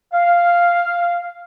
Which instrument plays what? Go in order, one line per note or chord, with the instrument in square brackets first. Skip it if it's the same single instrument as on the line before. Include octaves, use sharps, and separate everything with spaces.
[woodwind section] F5